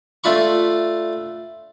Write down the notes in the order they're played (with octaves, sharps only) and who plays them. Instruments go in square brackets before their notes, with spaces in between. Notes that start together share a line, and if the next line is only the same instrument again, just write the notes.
[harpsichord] A3 D4 F4 B5 C#6